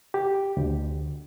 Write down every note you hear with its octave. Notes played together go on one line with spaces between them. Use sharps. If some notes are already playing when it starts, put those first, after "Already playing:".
G4
D2